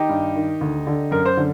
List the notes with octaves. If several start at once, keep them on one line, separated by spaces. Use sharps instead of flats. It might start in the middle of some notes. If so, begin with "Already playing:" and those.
Already playing: D#3 D#4 G4
G2
D#3
D2
D3
F#2 A#4
C5
D3